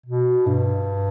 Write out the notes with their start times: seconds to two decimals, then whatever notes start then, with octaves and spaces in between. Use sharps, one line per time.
0.06 B2
0.46 G2